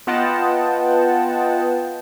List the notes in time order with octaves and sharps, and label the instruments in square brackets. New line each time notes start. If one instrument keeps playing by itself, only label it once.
[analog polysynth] B3 F4 D#5 F#5 G5 A5